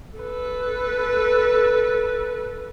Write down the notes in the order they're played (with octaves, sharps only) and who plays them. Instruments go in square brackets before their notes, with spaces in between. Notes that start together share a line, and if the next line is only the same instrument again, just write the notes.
[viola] A4 B4